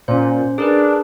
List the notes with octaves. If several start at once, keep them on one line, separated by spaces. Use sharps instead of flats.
A#2 C#4 C5
D4 G#4 A#4 B4